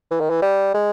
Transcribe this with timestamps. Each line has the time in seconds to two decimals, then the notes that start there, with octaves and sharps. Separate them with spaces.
0.11 E3
0.21 D#3
0.30 E3
0.42 G3
0.74 G#3